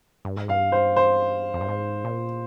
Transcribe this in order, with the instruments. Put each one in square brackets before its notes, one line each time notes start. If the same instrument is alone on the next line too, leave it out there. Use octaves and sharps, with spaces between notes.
[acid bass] G2
G#2
[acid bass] G2 [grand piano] F5
[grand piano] C5
C5
[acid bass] F2
G2
G#2
A#2